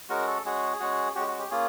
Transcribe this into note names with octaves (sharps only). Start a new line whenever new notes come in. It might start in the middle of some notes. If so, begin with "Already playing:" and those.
G#3 C#4 F#4 A#4
A4
G#3 C#4 F#4 G#4
G#3 C#4 F#4
G#3 C#4 F#4 G4
F#4
G4
A#3 C#4 F4 G#4